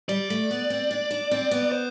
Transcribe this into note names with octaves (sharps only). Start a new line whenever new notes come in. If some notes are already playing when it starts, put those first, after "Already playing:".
G3 D5
A3
B3
C4
D4
D4
C4
B3
C5